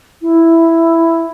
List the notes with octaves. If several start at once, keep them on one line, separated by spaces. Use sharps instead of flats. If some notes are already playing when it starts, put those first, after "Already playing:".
E4